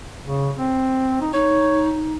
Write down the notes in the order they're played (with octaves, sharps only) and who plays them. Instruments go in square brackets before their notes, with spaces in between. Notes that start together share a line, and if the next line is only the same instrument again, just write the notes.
[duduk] C#3
C4
D#4
[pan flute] D#4 [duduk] C#5